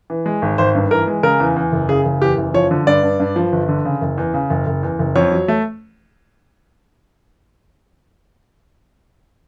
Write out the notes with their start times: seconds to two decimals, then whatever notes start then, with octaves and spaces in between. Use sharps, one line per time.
0.10 E3
0.26 G#3
0.42 G#1
0.58 G#1 C5
0.75 G2
0.91 E3 A#4
1.07 G#3
1.23 C#3 A#4
1.40 E2
1.56 E2
1.72 F#1
1.89 C#3 G#4
2.06 F#1
2.21 E2 G4
2.38 F#1
2.54 F3 C#5
2.71 D3
2.87 G2 D5
3.03 G2
3.20 G2
3.36 F3
3.52 G1
3.69 D3
3.85 C#3
4.02 F#1
4.18 E2
4.34 C#3
4.50 F#1
4.67 F#1
4.83 E2
4.99 F#1
5.15 F2 C#5
5.31 F#3
5.48 A3